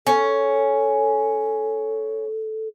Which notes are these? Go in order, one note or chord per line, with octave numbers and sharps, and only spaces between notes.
C#4 A4